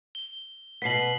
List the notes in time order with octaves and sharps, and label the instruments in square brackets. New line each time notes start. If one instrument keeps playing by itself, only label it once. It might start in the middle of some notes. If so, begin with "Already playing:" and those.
[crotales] G7
[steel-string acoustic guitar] B2 B3 [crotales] B6 C7 F#7